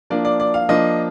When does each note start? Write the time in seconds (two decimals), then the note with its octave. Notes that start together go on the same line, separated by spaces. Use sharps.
0.10 F3 A#3 D4 F4 D5
0.25 D5
0.40 D5
0.54 F5
0.69 F3 A#3 D4 F4 D#5